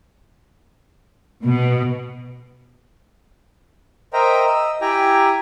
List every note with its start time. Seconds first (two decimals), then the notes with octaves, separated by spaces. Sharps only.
1.44 B2
4.13 A#4 C5 D#5 E5 G5 A#5
4.46 D#5 E6
4.81 E4 G4 G5 G#5 A#5